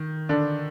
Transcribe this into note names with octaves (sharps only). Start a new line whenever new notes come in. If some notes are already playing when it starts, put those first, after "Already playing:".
Already playing: D#3
D3 D4